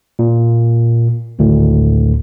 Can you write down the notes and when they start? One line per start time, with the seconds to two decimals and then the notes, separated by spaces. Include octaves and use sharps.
0.19 A#2
1.39 G#1 D2 A2